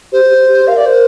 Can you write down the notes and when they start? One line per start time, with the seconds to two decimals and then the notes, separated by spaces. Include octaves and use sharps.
0.12 G4 C5
0.25 G4
0.48 G4
0.67 A#4 F5
0.77 D5
0.85 A#4 C5